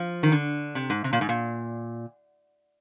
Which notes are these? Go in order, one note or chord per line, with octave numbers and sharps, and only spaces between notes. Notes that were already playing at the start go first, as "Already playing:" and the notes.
Already playing: F3
D#3
D3
C3
G#2
C3
A#2
G#2
A#2